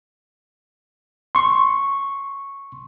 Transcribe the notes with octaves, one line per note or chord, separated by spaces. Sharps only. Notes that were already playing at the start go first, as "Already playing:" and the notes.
C6 C#6